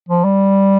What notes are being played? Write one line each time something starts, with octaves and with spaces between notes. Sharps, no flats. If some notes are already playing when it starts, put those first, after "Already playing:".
F3
G3